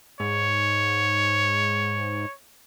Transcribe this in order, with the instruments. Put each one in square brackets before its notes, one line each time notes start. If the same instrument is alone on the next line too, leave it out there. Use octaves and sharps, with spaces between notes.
[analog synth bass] G#2 [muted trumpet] C#5